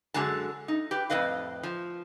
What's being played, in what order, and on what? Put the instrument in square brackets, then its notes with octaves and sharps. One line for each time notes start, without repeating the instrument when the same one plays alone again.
[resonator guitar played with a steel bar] F#2 D3 G#3 F#4 A5
D#4
G4 B4
F2 A2 B4 D#5 F5
F3